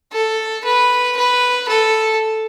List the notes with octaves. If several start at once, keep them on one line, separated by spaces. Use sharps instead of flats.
A4
B4
B4
A4